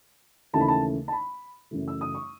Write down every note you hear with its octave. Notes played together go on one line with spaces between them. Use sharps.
D#2 C#3 E3 A3 A5
B5
A5
A5
B5
F#2 C#3 E3 A3
E6
D#6
C#6